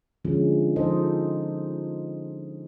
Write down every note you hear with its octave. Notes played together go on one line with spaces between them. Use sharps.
D3 F3 G#3 C#4
F3 D#4 A4 C5 D#5